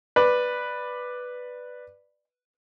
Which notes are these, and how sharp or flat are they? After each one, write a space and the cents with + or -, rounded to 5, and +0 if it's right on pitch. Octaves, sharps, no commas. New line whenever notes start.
B4 +0 D5 +10